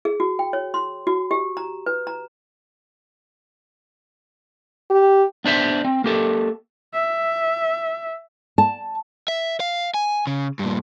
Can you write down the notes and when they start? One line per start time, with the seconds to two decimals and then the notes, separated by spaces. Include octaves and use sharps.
0.05 G#4
0.20 F#4
0.39 G5
0.53 C#5
0.74 C6
1.07 F#4
1.31 G4
1.57 A#5
1.86 B4
2.07 A#5
4.90 G4
5.45 B3 D4 C5 E5
5.85 C4
6.04 A#3 G4 A4
6.93 E5
8.58 A5
9.28 E5
9.60 F5
9.94 G#5
10.27 C#3
10.59 G2 A#2